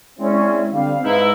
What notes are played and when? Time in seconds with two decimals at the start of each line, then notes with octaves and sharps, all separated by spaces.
0.19 G#3 C4 C#4 E4 D5
0.73 D3 G3 C4 F5
1.04 G#2 D#4 E4 B4